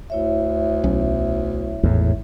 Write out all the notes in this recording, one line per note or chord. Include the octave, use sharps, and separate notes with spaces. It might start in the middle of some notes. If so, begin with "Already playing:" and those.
D2 E4 C#5 E5
B1 F#3 C#4
G#1 E2 A2